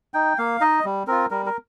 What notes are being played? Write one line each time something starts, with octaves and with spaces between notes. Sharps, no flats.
D#4 G5
A#3 F5
D#4 D#5
G3
C4 F4 A#4
G3 A#4
A#4